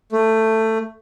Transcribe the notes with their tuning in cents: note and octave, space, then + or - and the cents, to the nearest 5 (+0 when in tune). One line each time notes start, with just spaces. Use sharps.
A3 +15